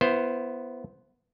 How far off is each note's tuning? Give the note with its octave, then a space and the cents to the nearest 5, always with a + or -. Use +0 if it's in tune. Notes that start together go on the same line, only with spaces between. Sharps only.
B3 +0 E4 +25 C5 +0